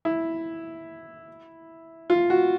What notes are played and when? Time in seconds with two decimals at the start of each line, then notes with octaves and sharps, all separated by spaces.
0.05 E4
2.10 F4
2.30 F#4